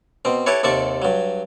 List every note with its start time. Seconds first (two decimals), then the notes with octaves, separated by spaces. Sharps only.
0.25 B2 C4
0.46 E4 G4 A4 B4 C#5
0.63 D#2 C3 A4 D5 C#6
1.02 G2 F#3